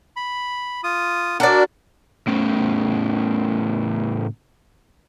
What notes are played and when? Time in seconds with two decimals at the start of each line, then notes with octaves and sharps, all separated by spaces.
0.16 B5
0.84 F4 D#6
1.40 D4 F#4 A#4 D5
2.27 A2 C#3